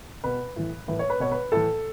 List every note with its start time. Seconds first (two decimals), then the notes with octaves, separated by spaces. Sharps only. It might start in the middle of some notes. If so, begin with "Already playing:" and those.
0.24 B2 B4
0.56 A2 E3
0.88 A2 E3 B4
0.99 C#5
1.10 B4
1.20 B2 C#5
1.32 B4
1.52 A2 E3 A4